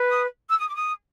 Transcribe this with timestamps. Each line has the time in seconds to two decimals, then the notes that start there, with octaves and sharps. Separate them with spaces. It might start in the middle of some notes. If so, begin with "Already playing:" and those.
Already playing: B4
0.08 D#6
0.49 E6
0.57 D#6
0.67 D6
0.75 D#6